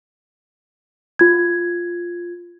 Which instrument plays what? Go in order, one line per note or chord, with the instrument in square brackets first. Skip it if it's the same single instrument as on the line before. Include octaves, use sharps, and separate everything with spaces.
[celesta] F4 G#6